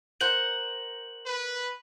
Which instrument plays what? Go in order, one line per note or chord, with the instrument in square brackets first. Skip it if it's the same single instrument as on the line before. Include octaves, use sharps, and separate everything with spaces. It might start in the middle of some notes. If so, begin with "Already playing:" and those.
[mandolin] A#4 C5 F#5 [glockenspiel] F#7
[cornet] B4